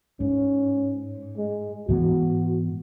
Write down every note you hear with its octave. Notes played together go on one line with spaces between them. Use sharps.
G#2 C#4
G#3
G#2 E3 B3 F#4